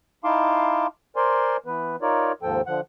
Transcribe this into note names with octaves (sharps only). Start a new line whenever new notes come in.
D#4 E4 F5 A5 C6 D6
A#4 C5 D5 G#5 C6
E3 B3 B4
D#4 F4 A#4 C#5 D5
D#2 G#2 F3 A4 G5
D3 F3 F#5